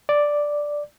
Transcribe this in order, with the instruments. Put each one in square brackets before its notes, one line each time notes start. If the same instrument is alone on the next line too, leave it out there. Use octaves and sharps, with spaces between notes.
[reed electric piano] D5